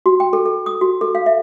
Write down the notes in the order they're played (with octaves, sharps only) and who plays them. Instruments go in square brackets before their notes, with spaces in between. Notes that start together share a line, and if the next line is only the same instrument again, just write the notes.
[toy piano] F#4
G5
A4
A4
D#6
F#4
A4
F5
E5